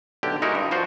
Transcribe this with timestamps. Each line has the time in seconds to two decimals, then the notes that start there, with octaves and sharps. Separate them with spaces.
0.23 B1 D3 G4
0.42 G#3 D#4 E4 F#4 A#4
0.55 G2
0.71 F3 F4 F#4 C5